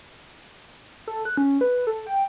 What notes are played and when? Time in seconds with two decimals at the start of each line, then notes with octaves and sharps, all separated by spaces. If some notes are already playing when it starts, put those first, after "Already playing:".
1.08 A4
1.25 F#6
1.37 C#4
1.61 B4
1.87 A4
2.07 G5